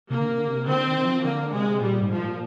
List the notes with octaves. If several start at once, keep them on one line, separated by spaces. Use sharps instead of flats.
C3 A#3
D3
C3
D3
C3
D3 C4
D#3
F3
D3 A#3
C3 G#3
A#2 G3
G#2
F3
A#2